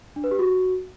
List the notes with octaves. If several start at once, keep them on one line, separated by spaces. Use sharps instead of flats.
D4
B4
G4
F#4